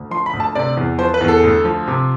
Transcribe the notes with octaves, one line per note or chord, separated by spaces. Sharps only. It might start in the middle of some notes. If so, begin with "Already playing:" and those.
Already playing: D2
F3 C6
B5
D2
A5
C3 D5
E2
F3 C5
B4
E2
A4
D2
F3
C3